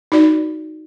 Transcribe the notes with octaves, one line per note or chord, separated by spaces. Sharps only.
D#4 F#4 D5